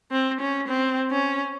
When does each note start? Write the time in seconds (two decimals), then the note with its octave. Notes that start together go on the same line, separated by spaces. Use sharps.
0.12 C4
0.41 C#4
0.68 C4
1.11 C#4